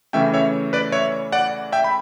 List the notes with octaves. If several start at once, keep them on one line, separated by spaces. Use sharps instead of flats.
C#3 E3 A3 C#4 E5 G5
C#5 E5
B4 D5
C#5 E5
D5 F#5
E5 G5
B5